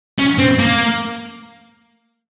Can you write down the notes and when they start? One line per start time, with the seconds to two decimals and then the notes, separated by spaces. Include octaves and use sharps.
0.18 C#4
0.38 C4
0.59 A#3